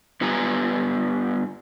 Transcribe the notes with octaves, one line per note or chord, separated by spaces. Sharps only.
G2 B3 F4 G4 G#5 A#5